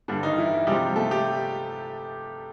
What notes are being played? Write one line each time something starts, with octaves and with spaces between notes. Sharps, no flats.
G2 D3 G3 D4
D#3 D#4
E3 E4
C3 F3 G3 G#3 G4
A3 A4
G4